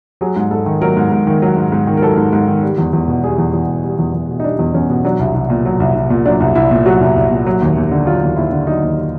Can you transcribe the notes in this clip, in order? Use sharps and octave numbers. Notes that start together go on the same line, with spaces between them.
F#3 G#4
G#2
G#2 A4
D#3
F#3 A#4
G#2
G#2
D#3
F#3
G#2
G#2
D#3
A#4
F#3 A4
G#2
G#2
D#3
G3
E2
E2
B2
G3 G#4
E2
E2
B2
G3
E2
E2
B2
D#4
G3 D4
E2
E2 C#4
B2
F#3 D4
C2
C2
A#2
F#3
C2
C2
A#2
F#3 D4
C2
C2 E4
A#2
F#3 F#4
C2
C2
A#2
F#3
D#2
D#2
D3
F#3 F4
D#2
D#2 E4
D3
F#3 D#4
D#2